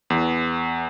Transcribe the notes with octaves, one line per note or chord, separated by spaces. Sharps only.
E2